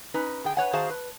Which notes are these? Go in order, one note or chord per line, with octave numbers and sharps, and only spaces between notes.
C#4 D#4 B4
D3 G#4 G5
B4 C#5 F#5 G#5
D#3 F#4 G#4 C5 F5 A5
B4